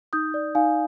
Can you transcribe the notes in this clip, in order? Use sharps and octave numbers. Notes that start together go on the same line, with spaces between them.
D#4 D#6 G6
D5
D#4 F5 G#5